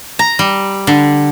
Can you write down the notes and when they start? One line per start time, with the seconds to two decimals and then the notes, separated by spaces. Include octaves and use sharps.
0.19 A#5
0.39 G3
0.87 D3